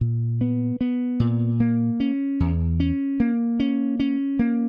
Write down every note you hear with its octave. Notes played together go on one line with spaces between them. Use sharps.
A#2
B3
B3
A#2
A#3
C#4
E2
C#4
A#3
C#4
C#4
A#3